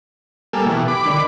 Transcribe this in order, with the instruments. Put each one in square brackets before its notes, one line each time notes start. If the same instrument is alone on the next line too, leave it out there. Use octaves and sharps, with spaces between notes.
[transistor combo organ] G3 A#3 A4 [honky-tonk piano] G#5
[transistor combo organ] B2 E3 [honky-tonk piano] G4
[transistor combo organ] B5 D6
[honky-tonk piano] D3 D#3 F#7